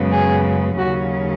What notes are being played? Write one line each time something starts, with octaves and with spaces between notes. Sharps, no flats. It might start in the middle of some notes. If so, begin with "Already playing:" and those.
Already playing: F#2 C#3 G#3 B3
G#4
D#2 C#3 F#3 C#4 F#4